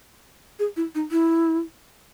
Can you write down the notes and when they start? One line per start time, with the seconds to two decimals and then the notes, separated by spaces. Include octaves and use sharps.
0.59 G#4
0.77 E4
0.95 D#4
1.11 E4